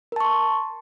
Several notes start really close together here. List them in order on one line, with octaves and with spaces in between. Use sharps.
A#4 A5 C#6 C6